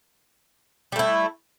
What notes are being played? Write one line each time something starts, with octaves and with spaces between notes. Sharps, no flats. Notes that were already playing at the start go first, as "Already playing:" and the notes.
G3 A3 E4